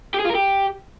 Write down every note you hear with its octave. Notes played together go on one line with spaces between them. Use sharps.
G4
G#4
F4
A#4
G4